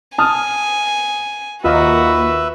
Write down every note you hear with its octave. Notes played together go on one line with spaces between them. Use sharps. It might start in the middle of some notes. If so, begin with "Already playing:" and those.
G#5 A5 D#6 F6
D#2 A#3 F4 F#4 B4 D#5 E5